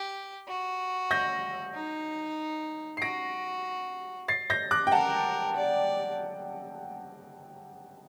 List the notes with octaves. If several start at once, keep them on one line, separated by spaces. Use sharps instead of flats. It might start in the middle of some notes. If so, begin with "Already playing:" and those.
Already playing: G4
F#4
G6 A#6
D#4
C7
F#4 A#6 D7
A6 C7
G6 A#6
D6 F#6
G5
A#4 F#5 A5
D5